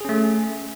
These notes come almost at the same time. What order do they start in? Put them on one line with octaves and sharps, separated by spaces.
G#4 C#4 A3